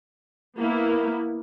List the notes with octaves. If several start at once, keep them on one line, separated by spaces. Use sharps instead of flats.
A#3 B3 E4